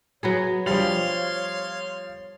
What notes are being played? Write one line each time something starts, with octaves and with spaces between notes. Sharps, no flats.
F#3 B3 G#4 C#5
F3 G3 F5 C6 F7